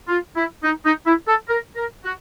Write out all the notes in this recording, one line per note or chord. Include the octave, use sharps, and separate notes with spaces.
F4
E4
D#4
D#4
E4
A4
A#4
A#4
F#4